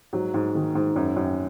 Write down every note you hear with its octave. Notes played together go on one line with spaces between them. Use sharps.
G#2 F#3
G#2
D#3
G#2
F#2
F#2